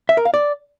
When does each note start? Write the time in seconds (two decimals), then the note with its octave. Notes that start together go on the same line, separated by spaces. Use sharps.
0.09 E5
0.17 A#4
0.25 F5
0.34 D5